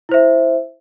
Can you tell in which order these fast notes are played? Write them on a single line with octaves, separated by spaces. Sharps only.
E4 C5 E5